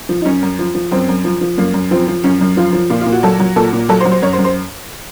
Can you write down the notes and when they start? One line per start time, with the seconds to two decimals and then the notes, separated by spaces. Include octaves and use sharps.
0.09 F3
0.21 D#4
0.25 F#2 C#4
0.42 F#2
0.59 F3
0.75 F3
0.91 F#2 C4
1.08 F#2
1.24 F3
1.41 F3
1.58 F#2 A#3
1.74 F#2
1.91 F3 C4
2.07 F3
2.24 F#2 C#4
2.41 F#2
2.57 F3 F4
2.73 F3
2.90 A#2 F4
3.01 F4
3.06 A#2
3.12 F#4
3.23 F#3 A4
3.40 F#3
3.56 A#2 A4
3.73 A#2
3.89 F#3 A4
4.00 C5
4.05 F#3
4.11 C5
4.22 F#2 C#5
4.33 C5
4.38 F#2
4.44 C5